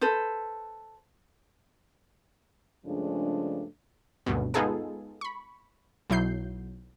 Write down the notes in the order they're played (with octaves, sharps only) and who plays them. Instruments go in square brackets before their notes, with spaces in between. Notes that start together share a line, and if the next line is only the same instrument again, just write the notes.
[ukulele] A4 B4 C5
[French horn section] G2 C#3 F3 G#3 A3 D4
[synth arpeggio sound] G#1 D2 G2 B2
G#3 B3 D#4 F4 G#4 A4
B5 C#6
B1 F#3 E4 G6 C7